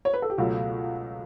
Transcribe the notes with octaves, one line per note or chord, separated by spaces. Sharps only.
C#5
B4
A4
G4
C#2 B2 F#3 A3 F#4